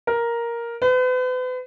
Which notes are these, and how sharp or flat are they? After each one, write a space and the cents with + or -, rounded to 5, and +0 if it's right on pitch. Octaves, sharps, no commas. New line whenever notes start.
A#4 +5
B4 +40